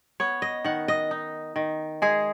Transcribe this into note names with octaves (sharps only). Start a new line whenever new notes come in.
B3 C#5
D#5
D#3 F#5
D#5
D#4
D#3
G#3 G#4